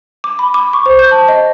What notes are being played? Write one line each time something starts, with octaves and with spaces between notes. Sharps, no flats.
D6
B5
D6
C#6
C5
G6
A5
D#5